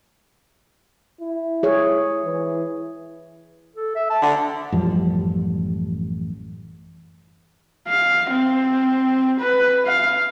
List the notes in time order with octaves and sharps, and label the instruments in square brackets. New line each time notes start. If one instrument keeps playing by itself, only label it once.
[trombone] E4
[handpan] G#4 C#5
[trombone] E3
[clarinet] A4
E5
A5
[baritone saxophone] D3
[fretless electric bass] A1 F#2 F3 G3
[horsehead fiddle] F5
C4
B4
F5